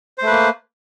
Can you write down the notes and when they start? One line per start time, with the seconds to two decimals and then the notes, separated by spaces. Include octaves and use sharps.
0.18 C5
0.22 A3
0.27 B4
0.31 A#3